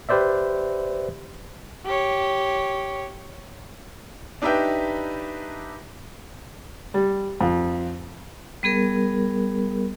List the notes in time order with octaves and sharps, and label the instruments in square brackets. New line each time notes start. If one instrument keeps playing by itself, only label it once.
[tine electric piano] G4 B4 C5 D5 E5
[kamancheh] G4 C#5
[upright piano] D4 D#4 G4 B4 E5 G5
[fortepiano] G3
F2
[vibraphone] G3 B3 G#4 A#4